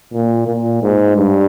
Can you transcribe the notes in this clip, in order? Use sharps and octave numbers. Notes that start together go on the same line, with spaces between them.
A#2
A#2
G#2
G2